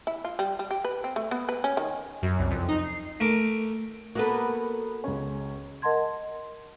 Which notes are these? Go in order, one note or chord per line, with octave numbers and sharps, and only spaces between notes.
E4
F4
G3
G3
G4
B4
C4
A3
B3
B4
C#4
D#3
F#2
C2
F2
D#4
C7
A3 A#4 D6
A#3 B3 F#4 A4 B4
C#2 C#4
A#4 D#5 F#5 A5 C6 G#6